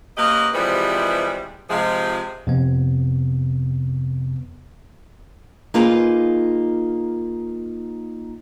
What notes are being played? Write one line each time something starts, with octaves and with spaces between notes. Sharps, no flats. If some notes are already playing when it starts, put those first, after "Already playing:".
F#2 A#3 G4 B4 D#5
C3 E3 F3 G3 G#3 B3
C3 F3 G#3
F2 C3 B3
A#3 D#4 F4 G#4 B4